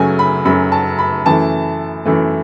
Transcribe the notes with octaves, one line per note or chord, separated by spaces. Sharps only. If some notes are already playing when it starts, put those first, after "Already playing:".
Already playing: F#2 C#3 F#3 A3 G#5
B5
F#2 C#3 F#3 A3 B5
A5
B5
F#2 E3 A3 A5
F#2 E3 A3